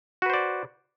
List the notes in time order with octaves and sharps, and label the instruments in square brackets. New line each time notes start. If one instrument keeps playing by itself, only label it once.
[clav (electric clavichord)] F#4
B4
C5
D5